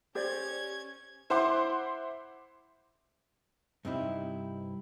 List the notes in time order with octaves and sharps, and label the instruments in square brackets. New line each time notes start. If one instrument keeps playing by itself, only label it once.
[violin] C#4 G#6 [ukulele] G4 C5 D5
[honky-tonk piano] E4 C5 F#5 C6 D6
[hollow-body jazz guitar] G2 C3 C4 D#4 E4